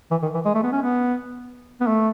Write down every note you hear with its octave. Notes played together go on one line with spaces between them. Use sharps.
E3
D#3
E3
G#3
A3
B3
C#4
B3
B3
A3